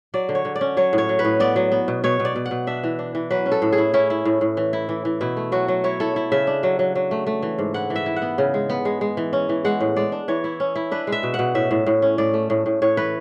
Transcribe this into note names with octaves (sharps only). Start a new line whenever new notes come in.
F#3 D5
D3
C#5
D3
D5
C#4
F#3 C#5
A2
C#5
F#3
B4
A2
B3 D5
F#3
B3
B2
B2 C#5
B2
D5
B2
F#5
B2
D4 E5
E3
D4
E3
F#3 B4
C#4
A4
A2
G#4
E4
C#4 E4
E4
A2
A2
E3
E4
E3
E3
B2 E4
A3
F#3 F#4
F#3
E4 C#5
E4 A4
E4
C#3 E5
D4
F#3
F#3
F#3
A3
A3
E3
G#2
E4 F#5
E3
E5
E4
F#5
B3
C#3
G#3
B3
G#3
G#3
E3
C#4
E3
G#3 F#5
A2
G#3 D5
D4
E3 C#5
E4
C#4
E4
D4 B4
G#3
E5
B2
F#5
B2
A2 E5
A2
A2
C#4
A2 D5
A3
A2
A2
A2 C#5
E3 B4